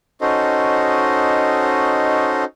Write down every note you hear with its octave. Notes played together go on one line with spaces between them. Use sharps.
C#4 D#4 F#4 A4 C5 D#5